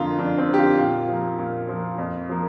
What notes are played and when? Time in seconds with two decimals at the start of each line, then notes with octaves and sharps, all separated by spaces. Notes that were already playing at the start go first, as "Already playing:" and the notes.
Already playing: F2 D3 A#3 F4
0.19 F2 D4
0.38 C4
0.49 D3 A#3 G4
0.58 F4
0.78 A#2 F4
1.08 F3 A#3
1.39 A#2
1.69 F3 A#3
1.98 F2
2.29 F3 A#3